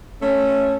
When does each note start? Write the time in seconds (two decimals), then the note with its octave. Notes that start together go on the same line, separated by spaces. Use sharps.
0.22 A3 C#4